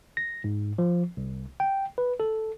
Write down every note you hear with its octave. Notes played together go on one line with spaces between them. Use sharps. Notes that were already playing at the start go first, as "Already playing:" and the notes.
A#6
G#2
F3
C2
G5
B4
A4